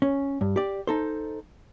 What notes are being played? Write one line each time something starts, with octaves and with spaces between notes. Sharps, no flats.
C#4
G2
G4 D5
D#4 A4 C5